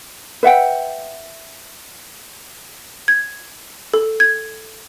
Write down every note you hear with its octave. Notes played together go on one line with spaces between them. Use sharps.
B4 E5 F#5 G5
G#6
A4
G#6